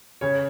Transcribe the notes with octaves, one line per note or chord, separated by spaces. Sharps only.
C#3 C#5